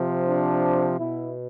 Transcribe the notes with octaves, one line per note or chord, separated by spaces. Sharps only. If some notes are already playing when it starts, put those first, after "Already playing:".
Already playing: C3 F3
D4
B2 E4